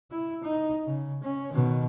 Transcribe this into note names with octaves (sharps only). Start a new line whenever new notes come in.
E4
D#4
C#3
C#4
B2 D#3